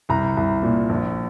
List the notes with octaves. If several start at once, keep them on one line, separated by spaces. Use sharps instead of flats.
C2 A#5
C2
A#2
A#1